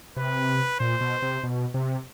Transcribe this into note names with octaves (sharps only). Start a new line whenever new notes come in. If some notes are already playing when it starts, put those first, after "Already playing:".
C3 B4
A#2 C5
B2
C3
B2
C3